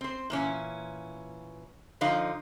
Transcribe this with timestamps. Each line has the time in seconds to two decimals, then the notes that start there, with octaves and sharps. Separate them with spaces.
0.01 C4 C5
0.30 A#2 E3 C#4
2.01 D3 F3 D#4 F5